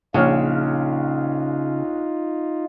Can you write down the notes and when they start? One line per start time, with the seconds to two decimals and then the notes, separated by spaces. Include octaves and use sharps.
0.14 A#1 C#3 D#4 F4 C#5 F6